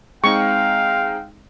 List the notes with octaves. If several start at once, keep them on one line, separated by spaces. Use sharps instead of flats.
G#3 C4 D#4 F5 G5 C#6